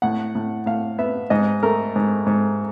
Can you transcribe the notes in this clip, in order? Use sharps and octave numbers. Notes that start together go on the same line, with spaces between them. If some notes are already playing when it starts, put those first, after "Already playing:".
A2 F#5
A2
A2 F5
B3 E5
G#2 D#5
A3 A#4
G#2
G#2